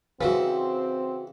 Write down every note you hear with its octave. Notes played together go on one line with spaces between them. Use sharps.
C#3 E3 C4 F#4 B4